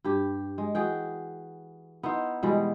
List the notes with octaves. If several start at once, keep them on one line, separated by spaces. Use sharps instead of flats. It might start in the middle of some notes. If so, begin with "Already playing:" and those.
G2 G4
G#3
E3 F#4 G#4 G5
B3 D#4 E4 C5
B2 E3 G3 G#3